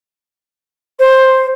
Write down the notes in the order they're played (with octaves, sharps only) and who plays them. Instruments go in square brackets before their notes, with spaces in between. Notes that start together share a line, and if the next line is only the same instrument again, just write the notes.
[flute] C5